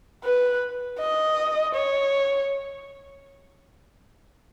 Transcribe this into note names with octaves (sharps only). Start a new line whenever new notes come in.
B4
D#5
C#5